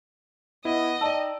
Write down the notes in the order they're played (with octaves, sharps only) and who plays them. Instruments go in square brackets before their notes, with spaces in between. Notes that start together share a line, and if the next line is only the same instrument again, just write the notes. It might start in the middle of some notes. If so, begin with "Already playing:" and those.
[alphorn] B3 [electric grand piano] E4 [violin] D#5
[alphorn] D#4 [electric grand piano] D5 E6 [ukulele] G5 A5